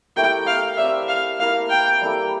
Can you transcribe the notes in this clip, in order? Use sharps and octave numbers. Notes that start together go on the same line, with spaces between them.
A3 E4 G4 A#4 G5
F5
C4 G4 D5 E5
F5
A#3 E4 A#4 F5
G5
G3 A#3 E4 A4